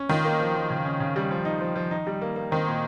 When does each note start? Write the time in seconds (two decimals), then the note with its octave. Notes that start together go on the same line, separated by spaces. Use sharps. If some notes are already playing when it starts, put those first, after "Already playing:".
Already playing: C#4
0.09 D#3 F4
0.25 A#3
0.40 F3
0.55 F3
0.70 C#3
0.85 C#4
1.00 C#3
1.16 G3
1.31 F3
1.45 D#4
1.61 F3
1.76 F3
1.91 D#4
2.07 G3
2.22 A#3
2.36 A#3
2.51 D#3 C4
2.66 A#2